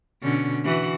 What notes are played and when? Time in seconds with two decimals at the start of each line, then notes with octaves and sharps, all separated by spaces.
0.22 B2 D3 C#4
0.64 E3 F#4